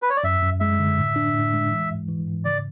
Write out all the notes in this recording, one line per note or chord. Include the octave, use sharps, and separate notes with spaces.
B4
C#5
D5
F#2 E5
F#2
G#3 E5
D3
A2
D4
A2
G#3
E3
G#2
E3
G#2
C#3 D5